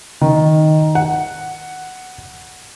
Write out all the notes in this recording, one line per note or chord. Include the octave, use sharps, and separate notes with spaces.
D#3
F#5